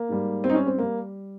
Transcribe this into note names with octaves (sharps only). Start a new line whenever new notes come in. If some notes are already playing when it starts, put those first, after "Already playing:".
Already playing: A#3
G#2 G3
C4
D#4
C#4
C4
G3 A#3